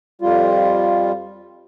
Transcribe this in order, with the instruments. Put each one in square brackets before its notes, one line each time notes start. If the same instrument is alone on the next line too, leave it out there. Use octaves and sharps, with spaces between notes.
[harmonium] F2 G3 F4